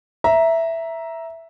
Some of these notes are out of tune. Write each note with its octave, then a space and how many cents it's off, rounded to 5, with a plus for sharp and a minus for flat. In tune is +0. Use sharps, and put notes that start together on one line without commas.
E5 +0 A#5 +10